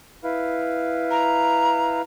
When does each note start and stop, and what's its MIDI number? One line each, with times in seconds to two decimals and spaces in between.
0.24 2.02 64
0.24 2.02 71
0.24 2.02 77
1.11 2.00 82